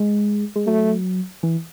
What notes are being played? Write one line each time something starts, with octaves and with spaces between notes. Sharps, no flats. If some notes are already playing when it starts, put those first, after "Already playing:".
Already playing: G#3
G#3
F#3 A3
E3